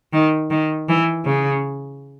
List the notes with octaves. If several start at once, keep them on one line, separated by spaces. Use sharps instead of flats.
D#3
D#3
E3
C#3